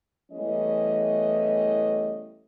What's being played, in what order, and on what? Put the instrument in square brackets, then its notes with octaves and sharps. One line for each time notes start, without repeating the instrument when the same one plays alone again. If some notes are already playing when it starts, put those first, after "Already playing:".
[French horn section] E2 E3 G3 A3 C#4 D#5